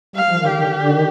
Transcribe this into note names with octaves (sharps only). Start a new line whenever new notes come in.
G3 F5
F3
D#3
D3 G4
D#3
D3
D3
D#3